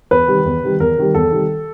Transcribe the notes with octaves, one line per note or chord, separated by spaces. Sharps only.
E2 B4
C3 D#3 G3
E2
C3 D#3 G3
E2 A#4
C3 D#3 G3
E2 A4
C3 D#3 G3